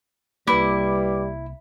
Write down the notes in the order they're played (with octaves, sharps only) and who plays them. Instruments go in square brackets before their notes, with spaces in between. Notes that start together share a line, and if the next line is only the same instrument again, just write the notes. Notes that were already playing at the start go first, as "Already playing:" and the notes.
[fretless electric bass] C2 A#3 [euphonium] G3 [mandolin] E4 [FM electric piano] B4 D6